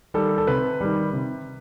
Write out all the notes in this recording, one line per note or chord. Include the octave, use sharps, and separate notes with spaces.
D#3 G3 A4
A4
C3 B4
D#3 G3
C3